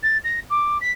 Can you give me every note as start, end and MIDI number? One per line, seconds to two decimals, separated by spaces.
0.03 0.18 93
0.24 0.40 94
0.50 0.78 86
0.81 0.92 95